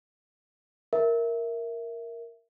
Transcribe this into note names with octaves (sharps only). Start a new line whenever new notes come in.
A#4 E5